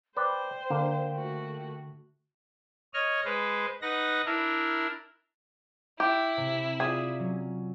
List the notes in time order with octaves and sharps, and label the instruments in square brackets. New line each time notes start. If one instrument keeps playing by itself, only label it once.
[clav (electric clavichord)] B4 D5 [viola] C5 [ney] G5
[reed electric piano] D3 [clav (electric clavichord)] A#3
[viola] A3 F#4
[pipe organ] C#5 D#5 F6
G#3 B4 C5
D#4 B4 F#5 A#6
D4 E4 A#4
[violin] E4 [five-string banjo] G4
[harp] C3
[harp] F4 D5 [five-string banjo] G#4
[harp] F#3 C#4